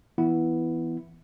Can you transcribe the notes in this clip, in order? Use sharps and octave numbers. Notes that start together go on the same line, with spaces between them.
E3 B3 E4